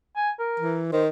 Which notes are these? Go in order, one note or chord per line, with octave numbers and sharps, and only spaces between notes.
G#5
A#4
E3
D#3 C5